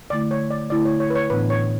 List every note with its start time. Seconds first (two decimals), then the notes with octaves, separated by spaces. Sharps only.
0.10 D3 A3 E4 D5
0.31 C#5
0.50 D5
0.70 D3 A3 E4 D5
0.85 C#5
1.00 C#5
1.10 B4
1.15 C#5
1.30 A2 E3 B3 D4 B4
1.50 C#5